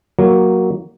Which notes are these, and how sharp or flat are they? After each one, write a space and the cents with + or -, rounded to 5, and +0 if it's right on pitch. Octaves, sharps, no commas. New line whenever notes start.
F#3 +0 A#3 +0